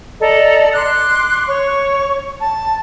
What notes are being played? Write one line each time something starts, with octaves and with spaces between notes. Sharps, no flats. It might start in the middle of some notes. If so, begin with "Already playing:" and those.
A4 D5 D#5 A#5
C6 D6 F#6
C#5 C#6
A5